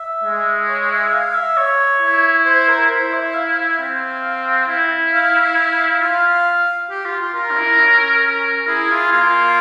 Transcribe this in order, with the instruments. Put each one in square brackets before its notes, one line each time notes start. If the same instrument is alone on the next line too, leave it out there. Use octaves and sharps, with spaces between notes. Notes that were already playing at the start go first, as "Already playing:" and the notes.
Already playing: [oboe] E5
[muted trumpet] G#3
[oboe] C#5
E5
F5
E5
C#5
[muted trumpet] E4
[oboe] C5
A#4
[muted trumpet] E4 [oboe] C5
[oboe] E5
F5
E5
F5
[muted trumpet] C4
E4
[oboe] F5
[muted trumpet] F4 [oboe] F5
[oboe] G4
F4
F4
[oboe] F4 [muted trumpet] A#4
[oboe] C#4
E4
C#4
[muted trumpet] A#4
[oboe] E4 [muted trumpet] G#4
[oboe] F4
[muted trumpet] A#3 [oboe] F4